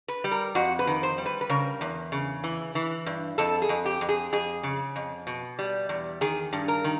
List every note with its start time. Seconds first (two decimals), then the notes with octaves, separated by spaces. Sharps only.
0.08 B4
0.24 G3
0.31 A#4
0.55 F2 F#4
0.79 B4
0.87 D#3
1.03 C5
1.18 G3
1.26 B4
1.41 B4
1.50 C#3 A#4
1.81 E2
2.12 C#3
2.44 E3
2.75 E3
3.06 G2
3.38 F2 A4
3.62 G#4
3.69 F2
3.85 G4
4.01 F2
4.09 G#4
4.32 F2 G#4
4.63 C#3
4.96 F2
5.27 B2
5.59 G3
5.89 E2
6.21 D#3 G#4
6.53 G2
6.68 A#4
6.84 D#3